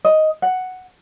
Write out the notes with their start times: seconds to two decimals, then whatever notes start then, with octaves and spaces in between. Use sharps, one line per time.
0.05 D#5
0.42 F#5